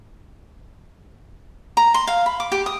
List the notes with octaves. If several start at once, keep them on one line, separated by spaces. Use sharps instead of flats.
A#5
C6
F5
B5
D6
G4
D#6